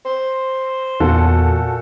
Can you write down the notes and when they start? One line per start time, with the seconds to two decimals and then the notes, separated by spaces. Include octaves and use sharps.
0.05 C5
1.00 E2 A#2 F#4 A4